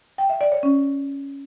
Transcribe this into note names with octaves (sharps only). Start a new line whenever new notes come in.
G5
E5
D5
C#5
C#4